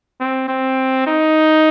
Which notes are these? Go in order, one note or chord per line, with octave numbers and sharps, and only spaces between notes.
C4
C4
D#4